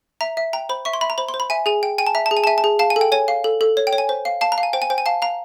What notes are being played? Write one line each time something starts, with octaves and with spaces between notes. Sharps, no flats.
E5 A#5
E5
G5 A#5
C5 B5
E5 C#6
C6
E5 B5
A#5
C5 B5
C6
C5
B5
E5 G#5
G#4 G#5
G5
G5 G#5
A5
E5 A#5
A5
G#4
G#5
A5
E5 G#5
A5
G#4
F5 A5
G#5
A4
G5
C#5 G#5
F5
A4
A4
C#5
G5
C#5
G#5
C5
F5
F5 A5
A#5
F5
G#5
C5 G5
G#5
C5 G5
G#5
F5 A5
F5 A#5